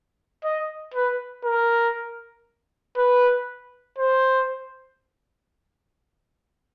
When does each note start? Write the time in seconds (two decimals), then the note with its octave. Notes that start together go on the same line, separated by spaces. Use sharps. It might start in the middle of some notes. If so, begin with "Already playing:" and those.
0.44 D#5
0.94 B4
1.44 A#4
2.97 B4
3.98 C5